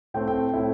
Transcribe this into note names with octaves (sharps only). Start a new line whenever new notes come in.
A2 A3 C4 G5
G5
A2 A3 C4 E4